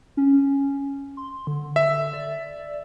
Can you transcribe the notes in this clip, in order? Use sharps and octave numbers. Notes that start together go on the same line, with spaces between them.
C#4
C6
D3
E5
D5